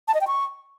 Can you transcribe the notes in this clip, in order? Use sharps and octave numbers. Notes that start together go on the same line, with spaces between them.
A5
D#5
G5
C#6